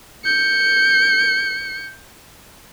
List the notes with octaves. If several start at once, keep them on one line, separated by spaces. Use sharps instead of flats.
G6 C#7